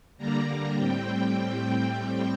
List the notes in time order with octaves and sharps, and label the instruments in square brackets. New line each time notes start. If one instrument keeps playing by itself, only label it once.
[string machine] D3 G3 A#3 D4 A#5
A#5
A2 G3 C4 G5